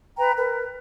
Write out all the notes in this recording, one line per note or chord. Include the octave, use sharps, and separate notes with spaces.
B4 G5 A#5
A#4 B4